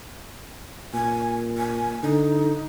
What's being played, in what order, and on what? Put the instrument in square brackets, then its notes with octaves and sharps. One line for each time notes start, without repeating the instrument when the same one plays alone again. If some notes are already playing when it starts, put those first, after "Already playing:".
[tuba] A#2 [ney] G#5
[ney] G#5
[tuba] D3 [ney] D#4